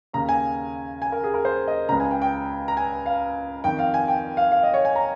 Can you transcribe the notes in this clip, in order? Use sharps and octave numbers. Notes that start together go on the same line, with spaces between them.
D#2 C#3 A#5
G#5
G#5
A#4
G#4
A#4
C5
D#5
C#2 C#3 A#5
G#5
G5
G5
A#5
G#5
F5
F2 D#3 G5
F5
G#5
G5
F5
F5
D#5
C#5
G#5
A#5